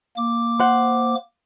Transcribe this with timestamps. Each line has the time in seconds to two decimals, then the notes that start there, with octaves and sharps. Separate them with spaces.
0.17 A#3 D6
0.59 C5 F#5